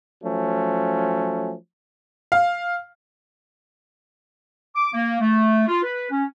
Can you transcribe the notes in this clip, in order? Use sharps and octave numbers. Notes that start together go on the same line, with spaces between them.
F3 F#3 A3 C#4
F5
D6
A#3
A3
F4
B4
C#4